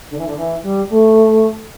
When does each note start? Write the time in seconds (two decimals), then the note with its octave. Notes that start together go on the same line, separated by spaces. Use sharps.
0.09 D3
0.17 E3
0.26 D3
0.36 E3
0.62 G3
0.89 A3